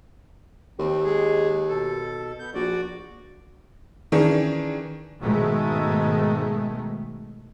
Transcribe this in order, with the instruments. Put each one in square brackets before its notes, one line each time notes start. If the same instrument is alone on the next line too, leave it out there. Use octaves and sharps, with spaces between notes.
[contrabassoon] D#2 [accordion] C4
[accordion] G#3 G#4
B2 A4
B3 G6
[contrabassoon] A#1 [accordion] F#4 D5
[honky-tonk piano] D#3 E3 C#4 D4 G#4
[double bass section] G#2 B2 D#3 G#3 A3